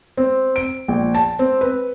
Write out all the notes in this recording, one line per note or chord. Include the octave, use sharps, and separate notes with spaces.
C4
D7
A#1
A5
C4
B4